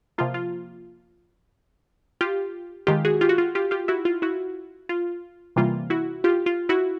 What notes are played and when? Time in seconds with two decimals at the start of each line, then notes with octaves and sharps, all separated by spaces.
0.18 C3 F3 A#3 F4
0.34 F4
2.21 F4 G4
2.87 D#3 G#3 F4 G4
3.05 F#4 G#4
3.21 F4 G4
3.29 F#4
3.38 F4
3.55 F4 G4
3.71 F4 G4
3.88 E4 F#4
4.05 F4
4.22 E4 F#4
4.89 F4
5.56 C3 E3 G3 A#3 F4
5.90 E4 F#4
6.24 F4 G4
6.46 F4
6.69 E4 F#4